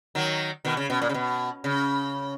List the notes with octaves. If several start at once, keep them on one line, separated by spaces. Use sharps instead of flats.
D#3 F#3
B2 D#3
C#3
B2
A#2
C#3
B2
C#3